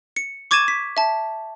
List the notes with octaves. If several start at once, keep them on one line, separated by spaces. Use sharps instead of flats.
C#7
C#6 D6 G#6 A6 D#7 E7
B6
E5 A5